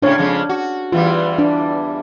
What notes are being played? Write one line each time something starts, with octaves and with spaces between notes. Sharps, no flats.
A2 C#3 D4 C#5
F2 C#3 G#3
F#4
E2 E3 G3 F4
D4